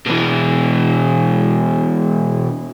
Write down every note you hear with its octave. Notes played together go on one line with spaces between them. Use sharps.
B2 E3